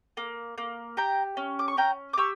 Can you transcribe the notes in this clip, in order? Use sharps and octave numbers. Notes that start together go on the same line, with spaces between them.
A#3
A#3
G4 G5 A#5
C#4
D6
C#6
C#4 G5 A#5
D6
G4 C#6 E6